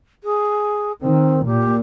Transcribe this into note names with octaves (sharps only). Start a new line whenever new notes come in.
G#4
D#3 C4
A#2 G4